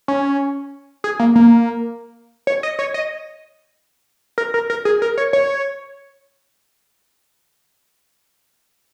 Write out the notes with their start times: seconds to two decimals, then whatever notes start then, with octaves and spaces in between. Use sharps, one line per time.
0.08 C#4
1.04 G#4
1.19 A#3
1.36 A#3
2.47 C#5
2.63 D#5
2.79 C#5
2.94 D#5
4.38 A#4
4.54 A#4
4.70 A#4
4.85 G#4
5.02 A#4
5.18 C#5
5.33 C#5